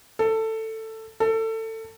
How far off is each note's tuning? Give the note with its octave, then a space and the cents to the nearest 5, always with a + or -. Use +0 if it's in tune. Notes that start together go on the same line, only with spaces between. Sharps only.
A4 +15
A4 +25